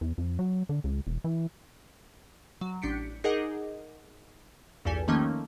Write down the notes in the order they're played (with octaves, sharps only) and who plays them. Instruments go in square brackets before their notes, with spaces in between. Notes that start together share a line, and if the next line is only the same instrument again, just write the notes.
[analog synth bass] E2
F2
F#3
D3
C#2
E1
E3
[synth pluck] F#3
A1 D4 G6 B6 C#7 D7
D#4 G#4 A#4 D#5 F#5 D6
A#1 E2 G2 G4 A4 G#5
D#3 F3 A3 A#3 C#4 D#4